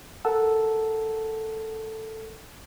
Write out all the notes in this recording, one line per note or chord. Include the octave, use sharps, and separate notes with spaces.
A4 A#4 F#5 A5 E6